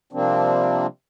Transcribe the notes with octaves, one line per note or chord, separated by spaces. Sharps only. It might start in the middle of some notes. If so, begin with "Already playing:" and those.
C3 F3 G3 A#3 C4 D4